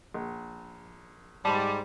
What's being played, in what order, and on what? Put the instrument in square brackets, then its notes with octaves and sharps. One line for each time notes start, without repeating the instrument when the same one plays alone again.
[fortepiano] A#1
[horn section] G#2 G3 [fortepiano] A5 B5